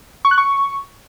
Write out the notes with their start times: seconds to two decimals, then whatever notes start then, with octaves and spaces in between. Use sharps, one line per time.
0.25 C#6
0.31 F#6
0.38 C#6